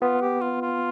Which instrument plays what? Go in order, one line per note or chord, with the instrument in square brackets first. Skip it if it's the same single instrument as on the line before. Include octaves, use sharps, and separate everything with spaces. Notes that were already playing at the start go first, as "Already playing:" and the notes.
[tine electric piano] B3 [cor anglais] F4
[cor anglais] G4
F4
F4